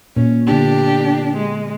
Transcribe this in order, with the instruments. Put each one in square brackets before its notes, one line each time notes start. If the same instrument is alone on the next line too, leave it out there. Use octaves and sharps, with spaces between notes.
[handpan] A#2 [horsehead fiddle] C#4
[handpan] D3 B3 [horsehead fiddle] D4 G4
[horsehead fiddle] G#3